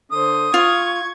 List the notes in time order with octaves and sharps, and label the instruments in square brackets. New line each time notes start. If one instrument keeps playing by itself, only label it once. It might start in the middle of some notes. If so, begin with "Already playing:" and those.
[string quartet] D3 C5 [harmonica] D#6
[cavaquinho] F4 [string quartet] C#6 G#6